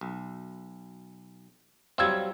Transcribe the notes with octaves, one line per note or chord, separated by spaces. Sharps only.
B1
F#3 G3 C4 F5 E6 G#6